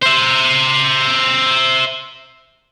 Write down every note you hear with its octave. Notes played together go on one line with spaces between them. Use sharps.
C5 E5